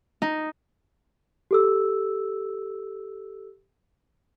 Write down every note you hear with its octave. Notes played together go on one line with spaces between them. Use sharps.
D#4
G4 A4 E6